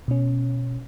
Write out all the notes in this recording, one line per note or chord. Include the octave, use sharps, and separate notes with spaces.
B2 C#4